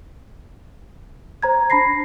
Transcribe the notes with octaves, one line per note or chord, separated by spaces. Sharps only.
C5 A#5 G#6
D4 A5 B5 A#6 C7